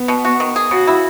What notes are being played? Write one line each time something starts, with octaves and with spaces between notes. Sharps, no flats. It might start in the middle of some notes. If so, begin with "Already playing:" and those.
Already playing: B3
B2
F#4
D#3
G#4
C#3 F#4
E4